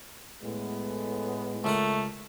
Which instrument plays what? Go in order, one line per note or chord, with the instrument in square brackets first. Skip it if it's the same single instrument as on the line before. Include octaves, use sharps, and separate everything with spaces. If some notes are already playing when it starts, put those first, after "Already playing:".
[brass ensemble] A2 G#3 B3
[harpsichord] C#2 A#4 F#5 [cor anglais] A3